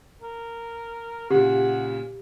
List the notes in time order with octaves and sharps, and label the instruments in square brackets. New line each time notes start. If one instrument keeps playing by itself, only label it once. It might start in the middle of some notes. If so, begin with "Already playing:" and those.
[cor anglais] A#4
[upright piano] A#2 C#3 [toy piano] G4 [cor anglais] F#5